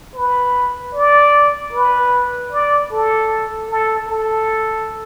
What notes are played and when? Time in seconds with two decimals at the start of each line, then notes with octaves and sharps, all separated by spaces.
0.15 B4
0.95 D5
1.73 B4
2.52 D5
2.92 A4
3.70 A4
4.09 A4